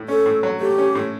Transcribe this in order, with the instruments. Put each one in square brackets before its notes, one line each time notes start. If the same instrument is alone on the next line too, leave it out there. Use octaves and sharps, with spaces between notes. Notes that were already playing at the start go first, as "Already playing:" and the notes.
Already playing: [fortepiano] A2
[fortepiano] C#4 [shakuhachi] A4
[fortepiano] A2
F#3
[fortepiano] A3 [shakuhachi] G4
[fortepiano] C#4
A2